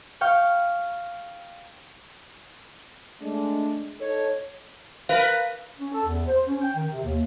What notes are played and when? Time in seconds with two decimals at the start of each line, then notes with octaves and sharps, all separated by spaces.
0.21 F5 G5 C#6
3.21 G#3 A3 D4
4.00 D#4 A4 C#5
5.09 A#4 B4 F5
5.79 C#4
5.92 A4
6.05 E2
6.27 C5
6.48 C#4
6.62 G5
6.75 D#3
6.91 C3
7.04 D#2